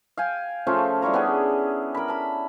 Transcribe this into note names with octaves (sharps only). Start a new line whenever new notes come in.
F5 G5 G#5
F3 A3 C#4 F4
G3 E4 C#5 A#5
B3 C#4 D4 G#4
A#4 B5
A5 B5